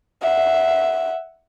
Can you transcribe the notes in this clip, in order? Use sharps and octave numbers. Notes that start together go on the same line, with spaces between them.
E5 F#5